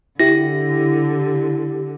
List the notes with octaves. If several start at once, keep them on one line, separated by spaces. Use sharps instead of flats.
D3 E4 G4 A#6